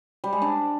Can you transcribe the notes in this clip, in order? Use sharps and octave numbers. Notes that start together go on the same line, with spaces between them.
G3
G#3
D4